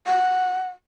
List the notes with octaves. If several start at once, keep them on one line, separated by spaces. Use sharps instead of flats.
F#5